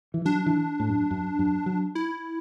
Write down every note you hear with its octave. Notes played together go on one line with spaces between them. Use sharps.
E3
F#3 D4
E3
A2
F#2
F#2
F#2
F#3
E4